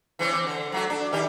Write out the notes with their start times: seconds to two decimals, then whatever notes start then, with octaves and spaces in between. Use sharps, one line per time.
0.19 E3 C4 C#4
0.33 C4
0.47 D3
0.72 F#3 A3 F#4
0.90 D4
1.13 D#3 G4